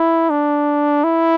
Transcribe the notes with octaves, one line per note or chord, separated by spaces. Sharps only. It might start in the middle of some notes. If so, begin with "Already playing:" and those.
Already playing: E4
D4
E4